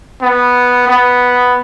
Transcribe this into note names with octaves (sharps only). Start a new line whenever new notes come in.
B3
B3